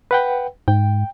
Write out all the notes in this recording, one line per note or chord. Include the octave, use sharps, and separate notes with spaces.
B4 F#5 G5
G#2 G5